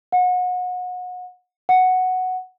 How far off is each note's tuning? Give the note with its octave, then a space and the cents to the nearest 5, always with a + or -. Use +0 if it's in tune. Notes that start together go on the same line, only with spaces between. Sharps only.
F#5 -30
F#5 +0